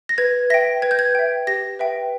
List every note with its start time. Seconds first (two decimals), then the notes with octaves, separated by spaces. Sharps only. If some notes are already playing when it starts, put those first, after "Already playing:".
0.09 A#6
0.18 B4 G#6
0.50 E5 G5 A#6
0.82 B4 G#6
0.91 G6
0.99 G#6
1.15 E5 G5
1.47 G4 A#6
1.79 B4 E5 G5